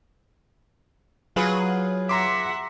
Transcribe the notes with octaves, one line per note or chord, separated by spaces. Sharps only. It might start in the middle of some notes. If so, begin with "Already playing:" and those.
F#3 F4 G#4 B4
E5 F#5 A#5 C6 D6